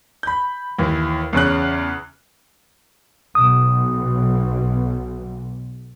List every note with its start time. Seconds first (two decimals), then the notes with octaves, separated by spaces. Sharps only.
0.23 B5 G6
0.79 D#2 E3
1.33 E2 C#3 C#4 F#6
3.35 B1 D#6